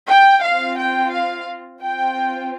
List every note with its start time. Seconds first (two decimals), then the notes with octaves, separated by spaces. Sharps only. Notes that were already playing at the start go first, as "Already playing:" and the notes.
0.09 G5
0.42 C4 F4 F5
0.77 G5
1.12 F5
1.81 C4 F4 G5